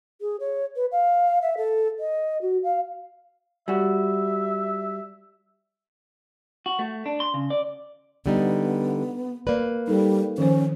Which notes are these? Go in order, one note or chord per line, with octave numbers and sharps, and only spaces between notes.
G#4
C#5
B4
F5
E5
A4
D#5
F#4
F5
G3 F#4 E5
F#4
A3
D4
C6
C#3
D5
D3 G3 B3 D#4
A#3 B4 D5
G3 D#4 A4
D#3 F3 C#4 C5